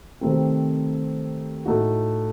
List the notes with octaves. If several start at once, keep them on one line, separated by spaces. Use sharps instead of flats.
C3 D#3 A3 C4
A2 A3 D#4 F#4